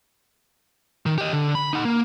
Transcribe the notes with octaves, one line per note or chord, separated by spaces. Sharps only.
D#3
G4 D#5
D3
B5
D#4 F#5
A#3